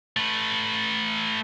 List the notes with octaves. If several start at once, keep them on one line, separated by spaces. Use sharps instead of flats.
A3 B4